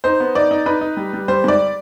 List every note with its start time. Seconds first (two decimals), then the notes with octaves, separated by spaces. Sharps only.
0.04 D#4 C5
0.20 B3
0.35 D#4 D5
0.51 D#4
0.66 D#4 B4
0.81 D#4
0.97 G3
1.13 G3
1.28 G3 C5
1.44 G#2 D5